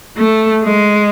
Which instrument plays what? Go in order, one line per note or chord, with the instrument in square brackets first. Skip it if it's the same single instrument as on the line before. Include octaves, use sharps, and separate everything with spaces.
[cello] A3
G#3